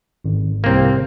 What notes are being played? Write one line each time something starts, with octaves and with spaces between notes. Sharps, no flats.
G#1
C2 A#3 C4